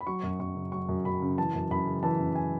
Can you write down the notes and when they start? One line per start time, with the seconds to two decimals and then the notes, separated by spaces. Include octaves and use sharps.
0.01 B5
0.07 F#3 C#6
0.23 F#2
0.39 F#2 C#6
0.56 C#3
0.72 F#3 C#6
0.89 F#2
1.05 F#2 B5
1.22 C#3
1.38 E3 A5
1.55 F#2
1.71 F#2 B5
1.87 C#3
2.03 E3 A5
2.19 F#2
2.35 G#5